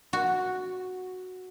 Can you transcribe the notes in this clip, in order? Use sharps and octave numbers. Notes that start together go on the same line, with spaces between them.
F#4